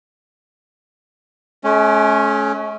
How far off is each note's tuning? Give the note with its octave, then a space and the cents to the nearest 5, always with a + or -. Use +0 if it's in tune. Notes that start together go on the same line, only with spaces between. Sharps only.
A3 -45 C#4 +0